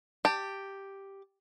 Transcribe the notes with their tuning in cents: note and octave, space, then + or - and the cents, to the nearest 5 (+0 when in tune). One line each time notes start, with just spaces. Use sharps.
G4 +0 A5 +20